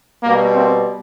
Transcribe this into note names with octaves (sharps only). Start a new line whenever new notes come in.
B2 G3 A#3
A#3 C4